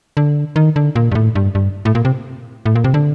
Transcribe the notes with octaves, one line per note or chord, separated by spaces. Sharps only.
D3
D#3
D3
A#2
G2
A2
G2
G2
A2
A#2
C3
A2
A#2
C3
D3